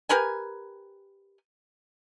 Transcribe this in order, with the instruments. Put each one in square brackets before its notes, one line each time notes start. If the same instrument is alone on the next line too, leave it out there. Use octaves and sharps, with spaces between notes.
[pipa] G4 A#4 B4 G#5